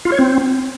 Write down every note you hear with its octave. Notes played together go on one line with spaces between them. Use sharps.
F4
C#5
C4